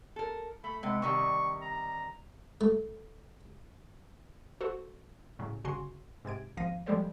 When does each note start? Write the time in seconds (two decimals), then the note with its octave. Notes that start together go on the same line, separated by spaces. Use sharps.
0.16 A4 A#4
0.64 A3 B5
0.83 C3 G#3 B3 F#5
1.02 C3 D#3 G3 C#6
1.61 A#5
2.61 A3
4.61 F#4 A4 C5
5.39 A2 C#3 F#3
5.64 G1 C#3 F#4 G#5 C6 C7
6.25 G#2 C3 G#6 D7
6.57 G#1 F3 F5 A#6 D#7
6.86 F3 G3 G#3 A4 C5 D5